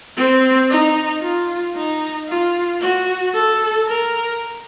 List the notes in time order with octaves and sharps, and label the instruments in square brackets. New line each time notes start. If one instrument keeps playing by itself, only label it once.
[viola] C4
D#4
F4
D#4
F4
F#4
A4
A#4